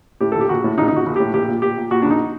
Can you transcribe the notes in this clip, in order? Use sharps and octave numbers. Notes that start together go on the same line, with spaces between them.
A2 G4
A#1 A4
G4
A#1 F#4
A2
A#1 D#4
D#4
A#1 F#4
A#1
A2 G4
A#1 G4
A#2
A#2 G4
A#2
A#2 F#4
D4
A#1
D#4